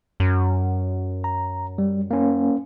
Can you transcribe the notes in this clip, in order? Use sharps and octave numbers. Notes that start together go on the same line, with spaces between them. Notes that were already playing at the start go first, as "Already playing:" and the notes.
F#2
A#5
G3
A#3 C#4